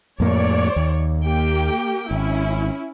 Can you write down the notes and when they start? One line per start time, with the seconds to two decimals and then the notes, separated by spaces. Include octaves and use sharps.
0.20 F2 A2 A#3 C#5 D5
0.76 D#2
1.24 A#3 G4 G5
2.11 G#1 C#4 E4